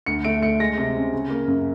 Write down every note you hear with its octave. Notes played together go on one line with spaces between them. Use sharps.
D2 C#7
A3 D7
A3 C#7
G#3 A#6
C3
C#4
C#3
A#3
F#2